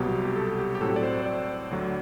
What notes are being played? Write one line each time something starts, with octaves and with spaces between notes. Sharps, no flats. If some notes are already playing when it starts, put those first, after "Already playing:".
Already playing: C2 B2 F#3 B3 G4
G4
A4
G4
G4
A2 F#3 C4 A4
D5
C5
C5
D5
D2 D3 F#3 A3